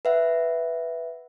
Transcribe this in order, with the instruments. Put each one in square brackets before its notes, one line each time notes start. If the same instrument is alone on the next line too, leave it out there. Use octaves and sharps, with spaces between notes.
[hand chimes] B4 E5 F#5